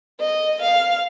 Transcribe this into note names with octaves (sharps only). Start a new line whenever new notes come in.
D#5
F5